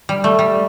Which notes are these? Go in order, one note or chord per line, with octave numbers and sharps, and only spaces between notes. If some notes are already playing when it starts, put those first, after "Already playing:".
G3
A3
G3